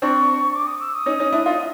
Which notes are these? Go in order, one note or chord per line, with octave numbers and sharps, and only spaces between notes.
C4 D4 C#6
D6
D#6
E6
D#6
C#4 D#4
C#4 D#4
D4 E4
D#4 F4